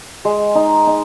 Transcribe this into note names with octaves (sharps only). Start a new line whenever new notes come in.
G#3
D#4
D#4